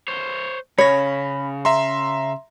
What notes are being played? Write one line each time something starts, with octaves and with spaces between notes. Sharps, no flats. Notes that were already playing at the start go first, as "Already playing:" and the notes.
C5 C#5
C#3 C#5 B5 A#6
E5 A#5 C6